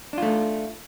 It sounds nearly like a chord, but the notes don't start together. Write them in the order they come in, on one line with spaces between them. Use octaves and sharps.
D4 F4 A3